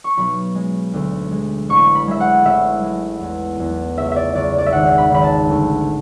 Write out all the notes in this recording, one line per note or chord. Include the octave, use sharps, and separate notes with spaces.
C#6
B1 B5
G#3
D2
G#3
A1 C#6
B5
G#3 E5
F#5
A1 E5
G#3
E2
E2
C#2 E5
D5 E5
C#2 D5
D5
E5
G#1 F#5
B5
G#1 B5
A5
D2